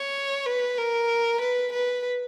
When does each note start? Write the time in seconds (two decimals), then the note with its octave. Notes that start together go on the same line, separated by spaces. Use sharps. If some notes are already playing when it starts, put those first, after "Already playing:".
Already playing: C#5
0.46 B4
0.78 A#4
1.41 B4
1.73 B4